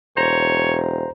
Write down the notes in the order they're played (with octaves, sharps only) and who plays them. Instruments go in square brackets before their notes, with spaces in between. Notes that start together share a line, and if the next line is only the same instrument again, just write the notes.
[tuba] E1 [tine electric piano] C5 A#5 [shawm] C#5